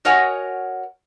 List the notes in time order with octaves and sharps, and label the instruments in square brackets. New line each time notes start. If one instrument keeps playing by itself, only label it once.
[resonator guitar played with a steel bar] F#4 A#4 C#5 D#5 F#5 G#5